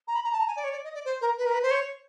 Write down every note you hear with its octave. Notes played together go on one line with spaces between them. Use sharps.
A#5
B5
A#5
A5
A#5
G#5
D5
C#5
D5
D#5
D5
C5
A#4
B4
A#4
B4
C5
C#5